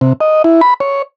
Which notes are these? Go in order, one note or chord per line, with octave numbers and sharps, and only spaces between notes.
C3
D#5
E4
B5
C#5